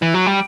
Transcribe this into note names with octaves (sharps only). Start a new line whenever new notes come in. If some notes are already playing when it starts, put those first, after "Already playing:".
E3
F#3
G3